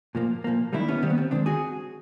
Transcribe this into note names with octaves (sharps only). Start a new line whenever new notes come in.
A#2 F3 A#3
A#2 F3 A#3
D#3 G3 A#3 D4 E4
B3 C#4
D#3 G3 A#3 C4
B3
C4
D#3 G#3 C4 D4
F#4 G#4